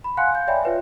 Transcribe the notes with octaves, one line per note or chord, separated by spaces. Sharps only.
B5
F5 F#5 G#5 C6 F#6 C#7
F5 G6
C#5 D5 E5 G5 G#5 B5
F4 B4 C#5 E5